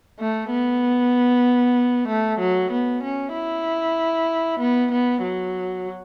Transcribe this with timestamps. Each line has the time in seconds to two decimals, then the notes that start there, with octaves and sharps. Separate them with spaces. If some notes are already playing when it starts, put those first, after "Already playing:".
0.20 A3
0.51 B3
2.08 A3
2.39 F#3
2.71 B3
3.03 C#4
3.34 E4
4.60 B3
4.92 B3
5.23 F#3